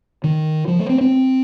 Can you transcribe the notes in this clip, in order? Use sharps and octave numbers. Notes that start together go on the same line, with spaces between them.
D#3
F3
A3
C4
C4